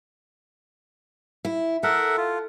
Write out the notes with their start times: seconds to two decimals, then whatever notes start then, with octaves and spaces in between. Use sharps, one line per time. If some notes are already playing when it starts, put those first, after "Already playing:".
1.45 E4
1.83 A4 A#4 E5 F#5
2.17 F4